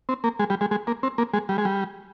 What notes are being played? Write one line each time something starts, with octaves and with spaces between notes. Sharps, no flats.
C4
A#3
G#3
G3
G#3
G#3
A#3
C4
A#3
G#3
G3
G#3
G3